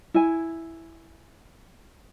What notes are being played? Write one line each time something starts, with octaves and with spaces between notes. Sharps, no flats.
E4 G#5